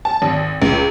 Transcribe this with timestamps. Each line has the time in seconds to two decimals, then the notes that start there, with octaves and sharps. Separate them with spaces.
0.05 A5
0.22 G#1
0.62 C#2